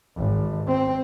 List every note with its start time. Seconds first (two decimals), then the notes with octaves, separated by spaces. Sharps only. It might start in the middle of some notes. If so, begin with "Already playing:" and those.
0.16 G#1
0.67 C4